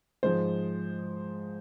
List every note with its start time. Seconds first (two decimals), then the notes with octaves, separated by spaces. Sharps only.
0.23 G#2 F3 G#3 C5